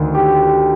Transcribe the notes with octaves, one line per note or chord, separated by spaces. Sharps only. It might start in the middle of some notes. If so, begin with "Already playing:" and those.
Already playing: D2 D#3
G4
G4